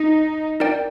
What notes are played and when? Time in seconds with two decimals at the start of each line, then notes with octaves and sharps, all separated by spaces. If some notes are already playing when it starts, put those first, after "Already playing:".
Already playing: D#4
0.60 D#4 A#4 D5 G5